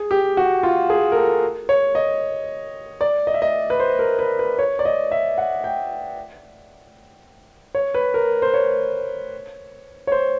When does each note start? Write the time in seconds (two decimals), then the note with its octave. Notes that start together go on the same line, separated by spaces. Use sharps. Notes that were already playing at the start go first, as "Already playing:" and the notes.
Already playing: G#4
0.11 G4
0.37 F#4
0.63 F4
0.90 G#4
1.12 A#4
1.16 A4
1.69 C#5
1.95 D#5
3.01 D5
3.27 D#5
3.34 E5
3.42 D#5
3.70 B4
3.80 C5
3.99 A#4
4.19 B4
4.39 B4
4.59 C#5
4.79 D5
4.85 D#5
5.12 E5
5.38 F#5
5.64 G5
7.75 C#5
7.94 B4
8.14 A#4
8.42 C5
8.54 C#5
10.07 C#5
10.12 C5